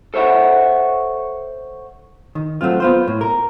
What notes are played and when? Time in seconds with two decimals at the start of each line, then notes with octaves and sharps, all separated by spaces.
0.14 A4 C5 C#5 E5 F#5
2.35 D#3
2.61 F#3 A3 C4 F4
2.80 B3 F4 C5
3.08 A2
3.21 A#4